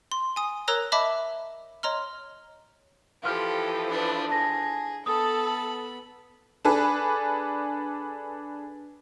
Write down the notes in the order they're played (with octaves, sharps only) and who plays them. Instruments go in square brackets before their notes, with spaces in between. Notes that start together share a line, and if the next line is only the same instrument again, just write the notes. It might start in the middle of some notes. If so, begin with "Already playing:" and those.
[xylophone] C6
G#5 D#6
A#4 C#5 A#5 E6 F#6 A#6
C#5 D#5 E5 A5 B5 D6
C#5 D#5 A#5 C6 F6
[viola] E3 F3 [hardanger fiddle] G4 A4 [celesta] F5 C6 F6
[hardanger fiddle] D4 B4
[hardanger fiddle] G#4 [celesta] A5 A#6
[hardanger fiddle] B3 B5 [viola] A4 A5 [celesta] D#6
[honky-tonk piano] D4 G#4 A4 B4